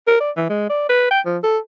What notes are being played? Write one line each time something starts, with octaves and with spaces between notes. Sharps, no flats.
A#4
D5
E3
G#3
D5
B4
G5
F3
A4